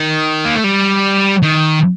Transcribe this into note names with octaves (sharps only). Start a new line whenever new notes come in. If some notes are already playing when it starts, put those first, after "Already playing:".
Already playing: D#3
A#3
A3
G3
D#3